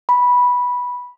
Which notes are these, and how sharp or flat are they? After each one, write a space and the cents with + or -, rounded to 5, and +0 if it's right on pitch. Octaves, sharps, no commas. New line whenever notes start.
B5 -10